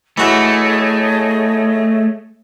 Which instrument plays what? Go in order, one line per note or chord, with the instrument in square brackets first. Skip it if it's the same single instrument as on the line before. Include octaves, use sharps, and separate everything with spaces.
[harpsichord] E3 F#4 [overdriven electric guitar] A3 [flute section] G#4 C#5 D#5